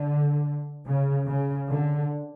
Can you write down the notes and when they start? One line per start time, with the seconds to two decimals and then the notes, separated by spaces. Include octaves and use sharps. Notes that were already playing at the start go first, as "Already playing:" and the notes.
Already playing: D3
0.85 C#3
1.26 C#3
1.68 D3